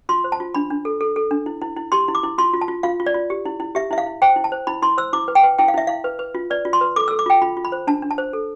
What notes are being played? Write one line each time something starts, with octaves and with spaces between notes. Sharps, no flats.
F4 C6
C5
A5
F4
D4 B5
D4
A4
A4
A4
D4
E4
E4
E4
G4 C6
E4
D6
E4
F4 C6
F4
A5
F4
F4 F5
F4
D5
F4
G4
E4
E4
G4 E5
E4 E5
F5
E4
C5 G5
E4
A5
C5
E4 B5
E4 C6
C5 E6
E4 D6
B4
G5
B4
E4 G5
F5
E4 E5
E4 F5
B4
B4
F4
B4 D5
F4
C6
B4
A4 D6
A4 E6
D6
F4 G5
F4 B5
F4
B5
C5
D4 A5
D4
A5
C5
A4